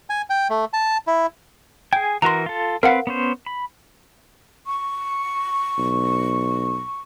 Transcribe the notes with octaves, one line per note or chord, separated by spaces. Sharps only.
G#5
G5
A3
A5
E4
G#4 G5 G#5
E3 F#4 A#4 A#5 C6
F4 A4
C4 A#4 B4 F5 F#5
B3 C#4 C5
B5
C#6
B1